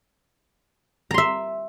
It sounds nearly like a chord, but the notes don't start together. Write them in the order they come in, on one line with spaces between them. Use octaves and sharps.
A#5 C6 E5